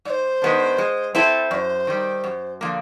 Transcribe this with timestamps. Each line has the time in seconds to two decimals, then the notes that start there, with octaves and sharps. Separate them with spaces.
0.05 G#2 D5
0.10 C5
0.42 D#3 G#3 B3 D4
0.78 G#3
1.15 C4 E4 A4 C5
1.51 F#2 D5
1.55 C5
1.87 D#3 G3
2.24 F#2
2.61 D3 F3 A#3